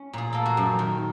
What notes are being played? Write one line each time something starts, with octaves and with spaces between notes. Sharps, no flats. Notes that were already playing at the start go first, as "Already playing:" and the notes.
Already playing: C#4
A#2 G#4
A#3 A4
F#4 G#4
F#2
D#3